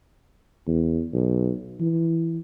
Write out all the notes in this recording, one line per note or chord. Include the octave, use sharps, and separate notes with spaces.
E2
B1
E3